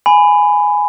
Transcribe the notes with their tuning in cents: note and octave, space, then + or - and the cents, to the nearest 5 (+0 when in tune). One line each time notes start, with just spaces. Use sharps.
G#5 +0 B5 +15